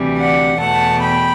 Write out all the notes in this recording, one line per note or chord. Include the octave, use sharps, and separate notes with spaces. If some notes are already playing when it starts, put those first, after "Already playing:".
Already playing: D2 C3 E3 G3
D5 F#5
E2 B2 A3 F#5 A5
G5 B5